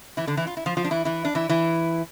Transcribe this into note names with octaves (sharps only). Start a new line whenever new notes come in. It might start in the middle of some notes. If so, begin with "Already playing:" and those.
E3 E4
D3 D4
E3 E4
F4
E4
F3 F4
F3 F4
D4
E3 E4
E3 E4
D4
E3 E4
E3 E4